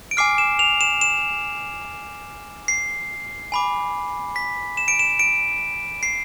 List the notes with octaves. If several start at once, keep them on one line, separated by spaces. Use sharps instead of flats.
D7
G#5 D6 F6 C7
E7
F7
E7
E7
C7
G#5 B5 D6
B6
E7
D7
E7
D7
C7